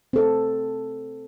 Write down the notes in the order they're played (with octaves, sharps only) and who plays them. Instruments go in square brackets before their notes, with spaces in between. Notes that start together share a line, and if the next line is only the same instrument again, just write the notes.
[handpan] C4 A4